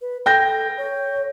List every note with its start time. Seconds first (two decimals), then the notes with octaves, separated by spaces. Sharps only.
0.01 B4
0.26 A4 G5 G6 A#6
0.77 C#5